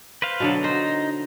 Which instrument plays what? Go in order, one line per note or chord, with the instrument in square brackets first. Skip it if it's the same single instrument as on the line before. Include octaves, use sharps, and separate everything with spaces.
[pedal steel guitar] B4 C5 F5
[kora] B2 D3 F#3
[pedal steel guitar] D#4 [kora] C5